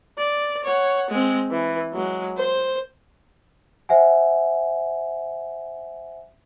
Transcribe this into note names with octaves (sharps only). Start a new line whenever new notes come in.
D5
C#5 F#5
G#3 C4
E3
F#3 G#3
C5
C5 E5 F#5 G#5